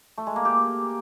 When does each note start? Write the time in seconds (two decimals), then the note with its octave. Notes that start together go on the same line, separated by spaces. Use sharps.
0.18 A3
0.27 G#3
0.36 A#3
0.45 G4